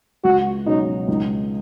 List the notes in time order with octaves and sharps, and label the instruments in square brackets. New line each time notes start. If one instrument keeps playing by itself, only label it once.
[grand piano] C#2 [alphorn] F#4
[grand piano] B2 F#3 C#4 [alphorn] D#4
[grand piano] C#2 [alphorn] D#4